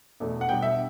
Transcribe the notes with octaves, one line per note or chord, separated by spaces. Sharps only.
E2 B2 A3 D4
F#5
B2 G3 D4 G5
E5